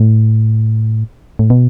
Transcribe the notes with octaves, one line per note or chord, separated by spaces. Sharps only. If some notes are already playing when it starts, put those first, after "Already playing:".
Already playing: A2
A2
B2